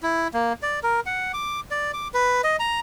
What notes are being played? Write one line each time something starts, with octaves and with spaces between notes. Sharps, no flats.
E4
A#3
D5
A#4
F#5
D6
D5
D6
B4
D#5
A#5